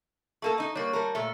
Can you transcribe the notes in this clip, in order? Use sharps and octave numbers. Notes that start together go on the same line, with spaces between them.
A3 A#3 A4 C#6
D#4 D#5
G3 A#3 C#5 C#6
G3 A3 A#4
A#2 A3 E5